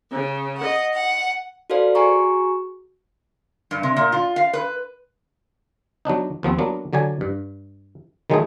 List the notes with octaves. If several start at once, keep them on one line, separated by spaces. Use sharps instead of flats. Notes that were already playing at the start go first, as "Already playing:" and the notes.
C#3
D#5 F#5
F#5
F#4 A4 B4 C5 D5 F5
F#4 G#4 G#5 A#5 C#6
G2
C3
A#2
F4
F5
B4
F#3 B3 D4 D#4
D#2 F3 B3 C4
F#3 A#3 B3 D4
D3 F#3 D5 G#5
G2
D#3 F#3 G#3 A3 D#4 G#4